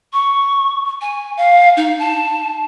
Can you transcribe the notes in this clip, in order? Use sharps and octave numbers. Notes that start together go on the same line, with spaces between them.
C#6
G#5
F5
D#4
A5